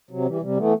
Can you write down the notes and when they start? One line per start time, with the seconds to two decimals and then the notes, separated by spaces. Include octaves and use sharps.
0.11 C3 F#3
0.25 E3 G3
0.41 C3 G3
0.57 E3 A3 B3